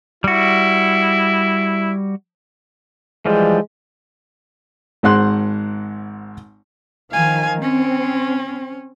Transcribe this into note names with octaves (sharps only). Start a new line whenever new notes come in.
G3 E4 F#4
E3 F3 G3 G#3
G#1 G#2 C5 F#5 C6 F#6
D#3 F3 F5 G#5
C4 C#4